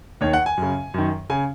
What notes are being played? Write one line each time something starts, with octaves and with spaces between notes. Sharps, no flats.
D#2 D#3 C#5
F#5
G#5
F#2 C#3
F#2 D#3
C#3 G#5